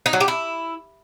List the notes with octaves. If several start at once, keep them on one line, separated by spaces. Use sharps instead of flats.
D#4
F#3
G4
E4